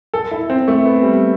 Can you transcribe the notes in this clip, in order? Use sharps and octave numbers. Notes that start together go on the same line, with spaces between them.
A4
E4
C4
A3
B3
G3